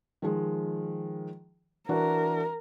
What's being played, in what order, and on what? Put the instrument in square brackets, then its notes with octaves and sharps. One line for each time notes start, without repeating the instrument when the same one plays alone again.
[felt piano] D#3 F3 G#3
[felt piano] E3 D4 F#4 [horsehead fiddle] A#4